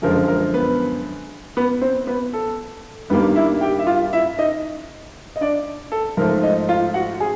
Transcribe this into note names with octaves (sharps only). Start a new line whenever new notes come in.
F#2 D3 F3 G#3 A#4
A#4
B3 B4
B3 B4
C4 C5
B3 B4
A4
G2 D#3 G3 A#3 B3 B4
E4 E5
G4 G5
E5
F4 F5
E4 E5
D#4 D#5
D#5
D4 D5
A4
G#2 F3 A3 A#4
D#4 D#5
F4 F5
F#4 F#5
G#4 G#5